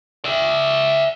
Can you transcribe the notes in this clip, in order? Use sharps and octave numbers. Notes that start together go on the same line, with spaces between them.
D5 E5